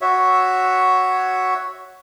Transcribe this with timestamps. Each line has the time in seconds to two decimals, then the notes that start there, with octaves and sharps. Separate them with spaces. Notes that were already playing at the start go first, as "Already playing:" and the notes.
0.01 F#4 C#5 E5